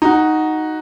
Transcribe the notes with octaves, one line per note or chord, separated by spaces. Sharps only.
D#4 F#4